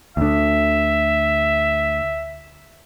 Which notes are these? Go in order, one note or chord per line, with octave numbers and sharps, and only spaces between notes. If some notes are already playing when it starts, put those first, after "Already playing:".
D2 D3 E5